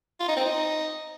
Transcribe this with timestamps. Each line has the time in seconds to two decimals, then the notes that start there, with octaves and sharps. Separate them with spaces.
0.20 F4
0.28 D#4
0.37 C4
0.45 D#4